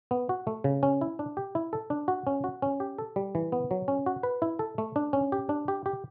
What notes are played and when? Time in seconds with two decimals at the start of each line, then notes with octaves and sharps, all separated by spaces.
0.11 B3
0.29 F#4
0.47 A3
0.64 C#3
0.83 C#4
1.01 E4
1.19 D4
1.37 G4
1.55 E4
1.73 A4
1.90 D4
2.08 F#4
2.27 C#4
2.44 F#4
2.62 C#4
2.80 G4
2.98 A4
3.16 G3
3.35 E3
3.52 B3
3.71 F#3
3.88 C#4
4.06 F#4
4.23 B4
4.42 E4
4.59 A4
4.78 A3
4.96 D4
5.13 C#4
5.32 G4
5.49 D4
5.68 G4
5.86 G4